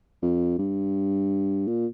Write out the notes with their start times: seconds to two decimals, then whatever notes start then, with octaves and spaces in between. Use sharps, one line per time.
0.22 F2
0.58 G2
1.67 A#2